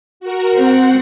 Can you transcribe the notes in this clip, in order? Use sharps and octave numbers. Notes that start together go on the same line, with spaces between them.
F#4 A#4
C4 F#5